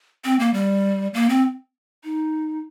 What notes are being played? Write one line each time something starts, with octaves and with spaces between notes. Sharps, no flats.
C4
A#3
G3
A#3
C4
D#4